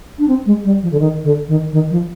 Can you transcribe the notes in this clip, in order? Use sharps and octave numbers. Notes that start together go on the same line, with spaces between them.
D4
C4
G#3
G3
F3
D3
D#3
D3
D#3
D#3
F3